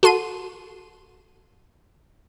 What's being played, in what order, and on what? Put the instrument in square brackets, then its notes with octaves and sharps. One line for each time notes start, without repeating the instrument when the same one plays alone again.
[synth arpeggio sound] F#4 A4 C6 D#7